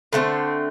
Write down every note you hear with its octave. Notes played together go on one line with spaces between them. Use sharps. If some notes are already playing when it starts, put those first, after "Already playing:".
D3 A3 C4